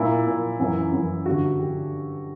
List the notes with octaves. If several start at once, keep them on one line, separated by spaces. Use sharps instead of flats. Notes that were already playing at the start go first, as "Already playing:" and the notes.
Already playing: A#2 E4
A#2
F#2 E3
F#2 E3
G2 D3 F#4
D3 G4